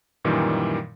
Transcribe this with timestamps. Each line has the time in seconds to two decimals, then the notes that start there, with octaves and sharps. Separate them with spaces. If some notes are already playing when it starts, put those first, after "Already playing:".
0.24 F#2 A#2 D#3 E3 G3